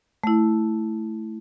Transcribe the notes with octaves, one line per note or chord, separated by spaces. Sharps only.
A3 E4